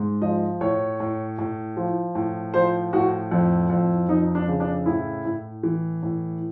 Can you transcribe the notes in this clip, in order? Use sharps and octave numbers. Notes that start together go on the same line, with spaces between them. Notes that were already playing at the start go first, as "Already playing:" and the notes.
Already playing: G#2
F3 D#5
A2 C#5
A2
A2
F3
A2
F3 C5
A2 F#4
F2
F2
F2 D#4
D4
C#3
D4
A2 E4
A2
E3
A2